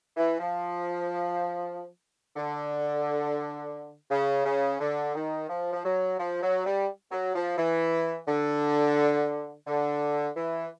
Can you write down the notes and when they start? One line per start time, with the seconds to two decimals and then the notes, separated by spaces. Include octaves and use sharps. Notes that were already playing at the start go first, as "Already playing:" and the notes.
0.17 E3
0.39 F3
2.37 D3
4.10 C#3
4.46 C#3
4.80 D3
5.15 D#3
5.50 F3
5.73 F3
5.84 F#3
6.19 F3
6.42 F#3
6.66 G3
7.12 F#3
7.35 F3
7.58 E3
8.28 D3
9.67 D3
10.36 E3